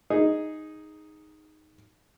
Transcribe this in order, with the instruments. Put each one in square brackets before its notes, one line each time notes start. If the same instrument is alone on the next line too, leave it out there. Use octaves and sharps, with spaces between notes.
[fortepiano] D#4 G#4